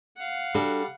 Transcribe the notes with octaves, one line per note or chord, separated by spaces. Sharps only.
F5 F#5
G3 D4 F#4 A4